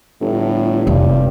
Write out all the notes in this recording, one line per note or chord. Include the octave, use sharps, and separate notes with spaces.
G1 A2
F1 G2